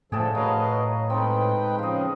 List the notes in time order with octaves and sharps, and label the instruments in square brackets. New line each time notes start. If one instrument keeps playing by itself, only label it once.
[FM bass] A2 [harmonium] D3 F3 A4 [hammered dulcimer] G#4 G5 A5
[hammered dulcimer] F#3 A#4 [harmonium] B4 D#5 F5
[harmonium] G#3 B4 G5 [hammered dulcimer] C4 D#4 A4
[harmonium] C#3 F3 [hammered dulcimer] D#5 F5